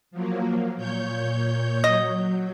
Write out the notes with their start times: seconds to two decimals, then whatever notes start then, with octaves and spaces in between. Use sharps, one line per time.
0.11 F3 F#3 A#3
0.77 A#2 C#5 G6
1.84 F#3 D#5